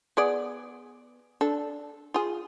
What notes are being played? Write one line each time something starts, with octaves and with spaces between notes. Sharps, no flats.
B3 G#4 D5
D4 A4
F4 G#4